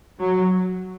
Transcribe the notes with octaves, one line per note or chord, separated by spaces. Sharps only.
F#3